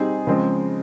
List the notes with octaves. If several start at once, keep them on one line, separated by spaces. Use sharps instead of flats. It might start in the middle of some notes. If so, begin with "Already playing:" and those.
Already playing: G3 C4 D#4 G#4
C#3 F3 G#3 C4